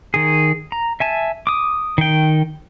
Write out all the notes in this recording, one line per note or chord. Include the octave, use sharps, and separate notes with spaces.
D#3 G#4
A#5
E5 G#5 A5
D6 D#6
D#3 G5